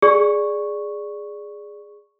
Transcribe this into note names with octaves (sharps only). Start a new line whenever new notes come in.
G#4 D5 C#6